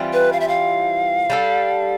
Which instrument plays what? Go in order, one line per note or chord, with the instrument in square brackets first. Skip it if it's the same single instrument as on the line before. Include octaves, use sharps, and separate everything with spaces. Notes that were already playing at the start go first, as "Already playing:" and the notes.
Already playing: [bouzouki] E3 G3 C4 F4
[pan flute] B4
F5
E5
F5
[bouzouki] G3 D4 A4